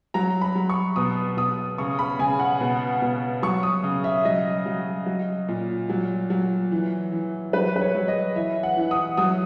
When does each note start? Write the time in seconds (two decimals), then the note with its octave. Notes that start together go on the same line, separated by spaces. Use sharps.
0.14 F#3 A#5
0.41 B5
0.55 F#3
0.70 C#6
0.96 B2 D#6
1.37 B2 D#6
1.78 C#3 C#6
1.99 B5
2.19 C#3 G#5
2.39 F#5
2.61 B2
3.02 B2
3.43 F#3 C#6
3.63 D#6
3.83 C#3
4.04 E5
4.25 F#3 D#5
4.66 F#3
5.06 F#3
5.48 A#2
5.90 F#3
6.30 F#3
6.72 E3
7.12 E3
7.53 F#3 B4
7.76 B4
7.81 C#5
7.95 F#3
8.08 D#5
8.36 E3 E5
8.63 F#5
8.77 E3
8.91 D#6
9.17 F#3 D#6